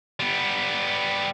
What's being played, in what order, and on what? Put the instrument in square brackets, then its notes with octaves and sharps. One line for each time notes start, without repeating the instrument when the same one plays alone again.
[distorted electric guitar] G3 B3